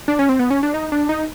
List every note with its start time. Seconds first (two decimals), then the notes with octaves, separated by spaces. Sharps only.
0.08 D4
0.19 C#4
0.29 C4
0.39 B3
0.50 C#4
0.63 D4
0.74 D#4
0.92 D4
1.09 D#4